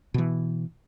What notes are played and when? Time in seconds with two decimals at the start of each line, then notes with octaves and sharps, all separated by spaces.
0.14 B2 E3